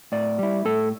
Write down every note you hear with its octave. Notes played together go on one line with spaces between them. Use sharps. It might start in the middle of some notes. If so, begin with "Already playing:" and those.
A2 D5
G3 E4
A2 A4